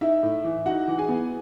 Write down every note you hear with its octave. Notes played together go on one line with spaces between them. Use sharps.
D#4 E4 E5
A2
E3
D#4 F#4 F#5
E3
G#4 G#5
B3